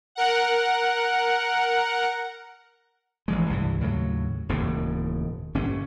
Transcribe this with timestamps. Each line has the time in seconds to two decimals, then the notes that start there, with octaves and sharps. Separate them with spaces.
0.15 A#4 F#5
3.28 A1 E3 G#3
3.49 C2 G2 E3
3.81 D#2 A2 C#3 F#3
4.49 E1 D#2 A2 C#3
5.55 G1 A#2 C#4